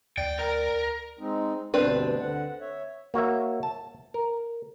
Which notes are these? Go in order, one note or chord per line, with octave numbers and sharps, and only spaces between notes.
D2 D5 G5
A#4
G#3 C4 D#4
D2 G2 B2 C4 D4 B4
D3 F#5
C#5 E5
A#3 F#4 C#5 E5
A5
A#4